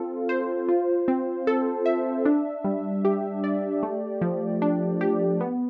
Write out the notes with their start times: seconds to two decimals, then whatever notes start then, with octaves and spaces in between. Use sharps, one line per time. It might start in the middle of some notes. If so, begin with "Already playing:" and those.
Already playing: C4 F4 A4
0.29 C5
0.69 F4
1.08 C4
1.47 A4
1.86 E5
2.25 D4
2.64 G3
3.05 G4
3.44 D5
3.83 A3
4.21 F3
4.62 D4
5.01 G4
5.41 B3